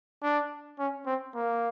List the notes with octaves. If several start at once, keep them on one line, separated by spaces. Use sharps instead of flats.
D4
C#4
C4
A#3